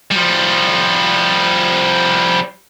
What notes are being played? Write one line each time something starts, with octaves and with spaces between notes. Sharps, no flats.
F3 G3